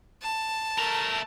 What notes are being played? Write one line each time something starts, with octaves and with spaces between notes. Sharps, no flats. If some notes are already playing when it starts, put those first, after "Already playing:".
A5
A3 A#4